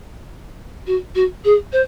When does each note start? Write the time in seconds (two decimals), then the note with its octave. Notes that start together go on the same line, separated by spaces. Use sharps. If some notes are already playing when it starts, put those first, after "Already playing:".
0.87 F#4
1.15 F#4
1.44 G#4
1.72 C5